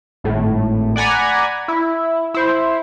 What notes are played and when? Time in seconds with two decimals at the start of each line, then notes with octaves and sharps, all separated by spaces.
0.24 G#1 A2
0.96 D5 F#5 G#5 A#5 B5
1.68 E4
2.34 E4 C5